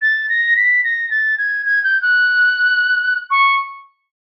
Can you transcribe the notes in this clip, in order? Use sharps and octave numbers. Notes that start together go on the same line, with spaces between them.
A6
A#6
B6
A#6
A6
G#6
G#6
G6
F#6
C#6